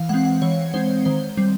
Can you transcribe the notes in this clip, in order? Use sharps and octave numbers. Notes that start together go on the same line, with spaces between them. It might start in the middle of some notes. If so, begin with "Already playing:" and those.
Already playing: E3 F5
G#3 C4 F#5
F#5
E3 C#5
G#3 C4 C5
D#3 C5
G3 C4